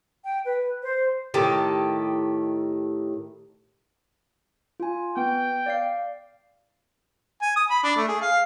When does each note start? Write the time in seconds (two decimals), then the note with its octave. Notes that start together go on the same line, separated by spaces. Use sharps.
0.24 G5
0.45 B4
0.83 C5
1.34 A2 D#3 G4 A4
4.80 F4 G#5
5.17 B3 G5
5.66 D5 F5 C7
7.42 G#5
7.56 D#6
7.70 B5
7.84 D4
7.96 A3
8.08 G#4
8.22 F5